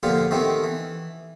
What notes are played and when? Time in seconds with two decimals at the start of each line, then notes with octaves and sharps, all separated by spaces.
0.03 A#2 D3 F3 B3 F4 G4
0.31 D#3 A3 B3 C4 G4
0.64 E3